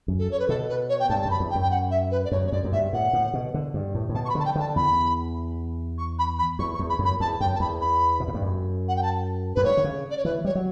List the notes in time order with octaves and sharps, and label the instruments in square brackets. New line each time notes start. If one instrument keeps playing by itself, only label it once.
[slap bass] F#2
[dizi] A4
C#5
B4
[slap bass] B2 [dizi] A4
[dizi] B4
C#5
G5
[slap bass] G2 [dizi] A5
[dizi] A5
[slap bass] F#2
[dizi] B5
[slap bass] E2
[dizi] G5
[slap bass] F#2
[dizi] G5
F#5
E5
B4
D5
[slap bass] F#2 [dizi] C#5
[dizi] C#5
[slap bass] F#2 [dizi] D5
[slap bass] F#2
[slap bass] G2 [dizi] E5
[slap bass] A2 [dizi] F#5
[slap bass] A2
B2
D3
G2
A2
A2
[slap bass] B2 [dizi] A5
[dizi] C#6
B5
[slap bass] D3 [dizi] A5
[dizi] G5
[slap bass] D3 [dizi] A5
[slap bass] E2 [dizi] B5
[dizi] C#6
B5
B5
[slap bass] E2 [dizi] C#6
[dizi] C#6
[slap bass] E2
[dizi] B5
[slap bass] F#2
[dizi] B5
[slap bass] E2 [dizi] A5
[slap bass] F#2 [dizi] G5
[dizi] A5
[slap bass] E2 [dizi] B5
[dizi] B5
[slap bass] B2
A2
G2
F#2
[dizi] F#5
G5
A5
[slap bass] F#2 [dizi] B4
[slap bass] G2 [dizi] C#5
[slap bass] D3
C#3
[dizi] D5
C#5
[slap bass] E3 [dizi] B4
[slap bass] G3 [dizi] C#5
[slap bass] F#3